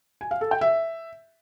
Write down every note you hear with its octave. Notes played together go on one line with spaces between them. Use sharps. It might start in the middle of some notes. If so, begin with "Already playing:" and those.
G#5
F5
A4
G5
E5